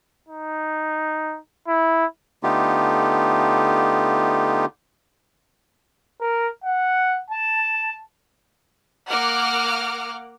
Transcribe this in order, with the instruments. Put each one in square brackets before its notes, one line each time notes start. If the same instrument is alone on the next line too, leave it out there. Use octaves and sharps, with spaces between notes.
[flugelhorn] D#4
E4
[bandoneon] D3 A3 B3 D#4 F4 G4
[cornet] A#4
F#5
A5
[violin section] A#3 F#5 D6 F6